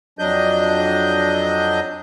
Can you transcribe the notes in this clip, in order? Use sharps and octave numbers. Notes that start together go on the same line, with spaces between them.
F2 F#3 D4 D#5 G6